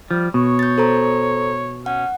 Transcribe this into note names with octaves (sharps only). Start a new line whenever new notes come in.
F3 G3
B2 C#5
G6 A6
A4 C5 A#5
C#4 F#5